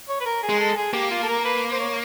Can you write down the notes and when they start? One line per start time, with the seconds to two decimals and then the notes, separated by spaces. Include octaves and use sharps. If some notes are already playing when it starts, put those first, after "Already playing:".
0.09 C#5
0.21 B4
0.26 A#4
0.43 G#4
0.49 G#3
0.60 A4
0.76 G#4
0.93 A#3 G4
1.10 F4
1.23 A4
1.28 A#4
1.45 B4
1.72 C5
1.80 C#5